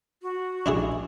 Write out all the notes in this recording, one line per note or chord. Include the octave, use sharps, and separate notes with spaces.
F#4
A#1 D4 E4 G#4